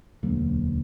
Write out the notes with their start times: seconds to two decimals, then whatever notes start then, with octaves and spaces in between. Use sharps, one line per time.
0.23 E1 D2 F#3 A#3